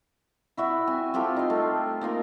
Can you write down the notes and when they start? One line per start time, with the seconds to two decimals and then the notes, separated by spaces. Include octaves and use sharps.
0.57 E4 F#4 E5
0.87 C4 G#5
1.14 C4 F4 G4 A4
1.36 D#4 C6
1.50 A3
2.01 A#3 D#4 F4 A#4